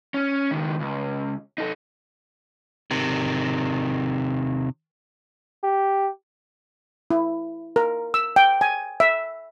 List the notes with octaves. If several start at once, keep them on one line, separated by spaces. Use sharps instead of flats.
C#4
C#2 D#3
C#2
D#4 A4
C3 D#3
G4
E4
A#4
E6
G5
G#5
E5